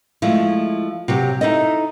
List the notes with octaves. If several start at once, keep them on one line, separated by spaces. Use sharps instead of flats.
F3 G#3 A3 E4
C3 F#3 G4
D#4 E4 A4 D#5